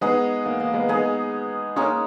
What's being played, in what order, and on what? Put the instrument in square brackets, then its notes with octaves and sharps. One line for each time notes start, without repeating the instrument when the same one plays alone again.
[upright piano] G#3 B3 [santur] D#4 G#4 D#5
[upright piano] A#3
A#3
G#3 B3
[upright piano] G#3 B3 [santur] D#4 G#4 D#5
[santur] G#3 D#4 A#4 D#5 [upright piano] A#3 C#4